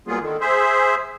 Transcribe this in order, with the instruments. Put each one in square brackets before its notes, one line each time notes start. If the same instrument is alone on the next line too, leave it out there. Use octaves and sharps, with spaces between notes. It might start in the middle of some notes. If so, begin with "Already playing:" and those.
[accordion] F#3 G3 A#3 B3 F4 G#4
D3 D#3
G#4 C5 E5